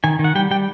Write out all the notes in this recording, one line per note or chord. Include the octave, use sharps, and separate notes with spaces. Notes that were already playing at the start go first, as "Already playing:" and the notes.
D#3 G#5
D#3
F#5
G3 G5
G3 G5